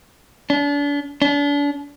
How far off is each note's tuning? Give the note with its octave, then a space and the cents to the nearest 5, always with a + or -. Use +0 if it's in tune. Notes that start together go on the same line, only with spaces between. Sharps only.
D4 -35
D4 -40